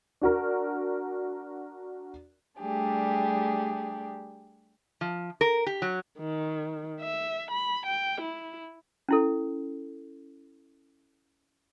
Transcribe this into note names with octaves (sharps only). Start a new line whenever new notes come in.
D4 F#4 A#4
G3 A3 D4 G4 G#4
F3
A#4
G4
F#3
D#3
E5
B5
G5
E4
C#4 E4 A4